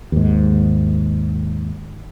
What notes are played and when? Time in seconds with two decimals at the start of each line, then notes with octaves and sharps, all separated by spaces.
0.12 D#2 G#2